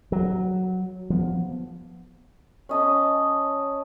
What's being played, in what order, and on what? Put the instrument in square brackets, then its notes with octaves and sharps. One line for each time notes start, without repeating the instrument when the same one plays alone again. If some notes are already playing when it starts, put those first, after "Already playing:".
[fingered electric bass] F#3
F3 B3
[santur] C#4 D#5 A5